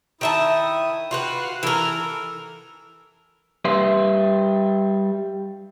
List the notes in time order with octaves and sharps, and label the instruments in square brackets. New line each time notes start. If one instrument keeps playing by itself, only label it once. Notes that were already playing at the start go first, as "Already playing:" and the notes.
[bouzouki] D#3 E5 A5 [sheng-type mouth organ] E4 D#6
[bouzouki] F4 F#4 B4 [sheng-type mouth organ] G5
[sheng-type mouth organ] F#5 C6
[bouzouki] E3 A#4 [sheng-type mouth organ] A4
[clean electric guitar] G3 B4 E5 C6